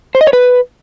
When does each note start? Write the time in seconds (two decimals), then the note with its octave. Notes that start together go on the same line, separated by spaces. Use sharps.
0.15 C5
0.21 D#5
0.27 C#5
0.33 B4